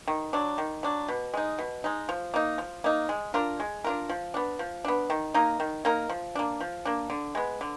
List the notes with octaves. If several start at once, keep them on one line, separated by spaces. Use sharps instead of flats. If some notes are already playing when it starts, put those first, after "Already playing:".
D#3
F#3 D4
D#3
F#3 D4
B2
G#3 D#4
B2
G#3 D#4
F3
A#3 D#4
F3
A#3 D#4
G#3
D4 F4 A#4
G#3
D4 F4 A#4
F3
B3 D4
F3
B3 D4
D#3
A#3 D#4 A#4
D#3
A#3 D#4 A#4
F3
A#3 D4
F3
A#3 D4
D3
G#3 B3
D3